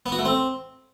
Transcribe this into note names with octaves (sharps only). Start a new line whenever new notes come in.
B3
F#4
A3
C4